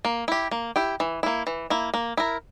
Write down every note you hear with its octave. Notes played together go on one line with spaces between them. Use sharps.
A#3
E4 G4
A#3
E4 G4
E3
A#3 E4
E3
A#3 E4
A#3
E4 A#4